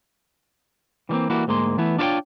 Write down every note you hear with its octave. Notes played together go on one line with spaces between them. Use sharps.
E3 G3 A#3 C4
E3 G3 A#3 E4 F#4
D2 G#2 G#3 A#3 C6
E3 A3 B3 E4
D4 F4 F#4 C5 C#5 G5